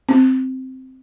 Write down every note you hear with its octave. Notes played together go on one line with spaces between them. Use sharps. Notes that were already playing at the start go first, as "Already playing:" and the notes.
C4